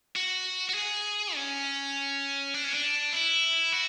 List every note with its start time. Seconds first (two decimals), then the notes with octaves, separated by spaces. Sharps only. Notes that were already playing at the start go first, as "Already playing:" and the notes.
0.16 F#4
0.69 F#4
0.74 G#4
1.35 C#4
2.54 D4
2.64 C#4
2.74 D4
3.13 E4
3.72 F#4